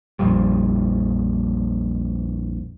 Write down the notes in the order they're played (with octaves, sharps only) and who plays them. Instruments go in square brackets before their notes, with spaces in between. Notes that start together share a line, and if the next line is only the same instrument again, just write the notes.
[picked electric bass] A#1 F2 F3 G3